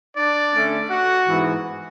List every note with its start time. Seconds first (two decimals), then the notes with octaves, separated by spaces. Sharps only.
0.17 D4 D5
0.53 D3 A3 C#4
0.90 F#4 F#5
1.27 G#2 E3 B3